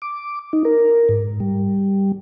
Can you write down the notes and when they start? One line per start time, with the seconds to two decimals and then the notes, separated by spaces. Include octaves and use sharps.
0.02 D6
0.53 D#4
0.65 A#4
1.09 G#2
1.40 G3